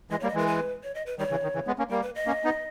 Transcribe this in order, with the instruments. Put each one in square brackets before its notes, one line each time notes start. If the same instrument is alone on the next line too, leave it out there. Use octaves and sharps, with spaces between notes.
[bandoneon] E3 G#3 [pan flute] D#5
[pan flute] C#5
[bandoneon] G3 A#3
[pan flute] D#5
[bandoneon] E3 G#3 [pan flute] A#4
[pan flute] B4
C#5
D#5
B4
[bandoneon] D#3 G3 [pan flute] C#5
[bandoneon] C#3 E3
D#3
C#3 E3
G#3 B3
A#3 C#4
[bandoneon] G3 A#3 [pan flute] A#4
[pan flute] B4
D#5
[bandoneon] A#3 C#4
B3 D#4